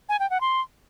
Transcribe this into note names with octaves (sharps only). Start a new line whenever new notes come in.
G#5
G5
F#5
C6